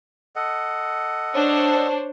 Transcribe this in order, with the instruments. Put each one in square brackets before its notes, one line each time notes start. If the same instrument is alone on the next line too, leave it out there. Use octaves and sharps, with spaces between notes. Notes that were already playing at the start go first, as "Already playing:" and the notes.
[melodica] A4 D#5 F#5
[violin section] D4 C5 C#5